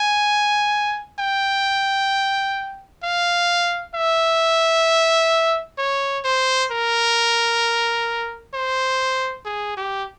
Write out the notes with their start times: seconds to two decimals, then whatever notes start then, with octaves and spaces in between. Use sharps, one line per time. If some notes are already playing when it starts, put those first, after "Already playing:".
Already playing: G#5
1.19 G5
3.03 F5
3.94 E5
5.78 C#5
6.24 C5
6.71 A#4
8.54 C5
9.45 G#4
9.77 G4